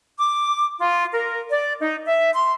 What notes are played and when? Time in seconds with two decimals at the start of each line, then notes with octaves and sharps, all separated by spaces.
0.19 D6
0.79 F4
1.12 A#4
1.50 D5
1.80 D#4
2.06 E5
2.33 C6